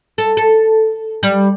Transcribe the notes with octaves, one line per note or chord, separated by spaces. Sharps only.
A4
A4
G3